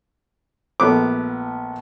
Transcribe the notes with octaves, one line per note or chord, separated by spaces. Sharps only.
A#1 A3 B3 D6